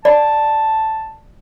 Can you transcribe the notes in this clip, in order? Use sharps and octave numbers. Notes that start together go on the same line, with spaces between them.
D5 A5